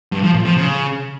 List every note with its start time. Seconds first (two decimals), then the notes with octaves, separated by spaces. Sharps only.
0.12 G2
0.23 F3
0.34 A2
0.46 F3
0.57 C#3